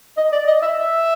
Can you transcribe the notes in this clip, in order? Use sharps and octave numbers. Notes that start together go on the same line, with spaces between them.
D#5
D5
D#5
E5
E5